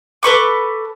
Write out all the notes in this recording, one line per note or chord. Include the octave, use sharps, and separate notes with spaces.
A4 B4 C#6 D6